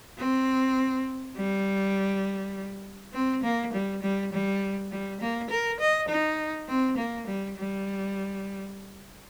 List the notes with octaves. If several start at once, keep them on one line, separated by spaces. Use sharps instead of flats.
C4
G3
C4
A#3
G3
G3
G3
G3
A#3
A#4
D#5
D#4
C4
A#3
G3
G3